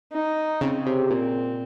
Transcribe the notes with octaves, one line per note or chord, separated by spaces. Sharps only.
D#4
C#3 C4
C3
A#2 C4